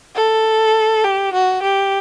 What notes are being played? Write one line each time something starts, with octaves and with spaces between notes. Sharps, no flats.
A4
G4
F#4
G4